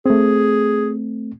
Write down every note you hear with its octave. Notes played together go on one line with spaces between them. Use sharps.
A3 C4 G#4